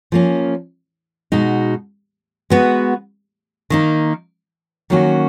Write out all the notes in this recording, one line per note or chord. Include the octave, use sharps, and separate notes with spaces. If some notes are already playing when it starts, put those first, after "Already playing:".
F3 A#3 C#4
B2 G#3 D#4 F#4
G#3 B3 F#4 B4
D#3 A#3 D#4
D#3 F#3 A#3 C#4 F#4